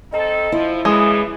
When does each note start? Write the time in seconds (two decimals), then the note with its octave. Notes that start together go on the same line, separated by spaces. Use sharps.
0.12 C4 D#4 A4 D#5
0.52 F3 E4
0.85 C#3 E3 G#3 D#6